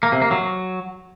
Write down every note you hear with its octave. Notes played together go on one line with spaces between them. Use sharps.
A#3
C3
A#3
F#3